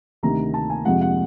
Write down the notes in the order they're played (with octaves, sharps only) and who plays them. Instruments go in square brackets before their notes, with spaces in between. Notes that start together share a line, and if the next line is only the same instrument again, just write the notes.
[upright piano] D2 C3 D#3 A#5
A5
G#5
F2 C3 F3 G#3 F#5
F#5